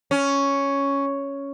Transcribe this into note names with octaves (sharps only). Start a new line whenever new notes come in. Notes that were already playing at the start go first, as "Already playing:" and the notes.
C#4